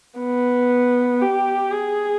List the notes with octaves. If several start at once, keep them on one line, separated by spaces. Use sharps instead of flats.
B3
G4
G#4